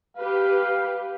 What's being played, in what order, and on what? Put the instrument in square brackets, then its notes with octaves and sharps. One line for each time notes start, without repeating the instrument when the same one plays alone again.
[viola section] G4 B4 [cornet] F5